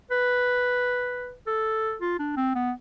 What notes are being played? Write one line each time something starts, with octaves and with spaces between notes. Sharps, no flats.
B4
A4
F4
D4
C4
B3